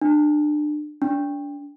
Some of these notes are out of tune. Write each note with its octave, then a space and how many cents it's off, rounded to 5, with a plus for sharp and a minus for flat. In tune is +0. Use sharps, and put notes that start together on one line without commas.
D4 +30
D4 -30